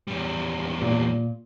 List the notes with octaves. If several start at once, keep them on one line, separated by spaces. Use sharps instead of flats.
E2 G3
A#2